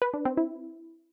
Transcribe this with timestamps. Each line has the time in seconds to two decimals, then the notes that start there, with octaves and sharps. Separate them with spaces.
0.02 B4
0.14 D4
0.25 C4
0.37 E4